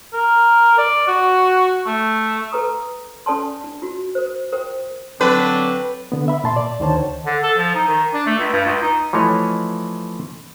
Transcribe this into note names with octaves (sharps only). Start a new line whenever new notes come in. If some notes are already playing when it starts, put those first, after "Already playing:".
A#4
D5
F#4
A3
A4 B4 A#5 D#6
C#4 A4 D5 G#5 A5 C6
D4
F4 F#4
A#4 C5
A#4 C5 G5
D3 F#3 C4 D4 B4
D3 B3
E5 B5
A#2 A5 C6
D5
D2 D3 D#3 C5 C#5 A5
D3
A4
F3
D#4
D#3
D4
A3
C#2
G2
C#2
D#4
E3 F3 A3 C#5 D#5